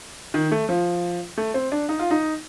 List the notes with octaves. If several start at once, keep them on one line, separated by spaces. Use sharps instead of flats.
D#3
A3
F3
A3
C4
D4
D#4
F4
D#4